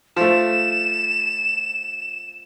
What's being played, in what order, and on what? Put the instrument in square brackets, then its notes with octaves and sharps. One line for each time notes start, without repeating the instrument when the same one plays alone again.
[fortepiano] F3 A3 [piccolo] E7